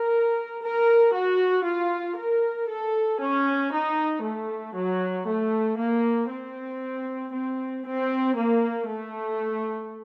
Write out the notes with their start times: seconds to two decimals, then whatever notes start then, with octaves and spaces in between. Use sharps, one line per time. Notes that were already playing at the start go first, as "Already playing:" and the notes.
Already playing: A#4
0.62 A#4
1.14 F#4
1.65 F4
2.16 A#4
2.68 A4
3.20 C#4
3.72 D#4
4.23 A3
4.75 F#3
5.26 A3
5.78 A#3
6.29 C4
7.33 C4
7.85 C4
8.36 A#3
8.88 A3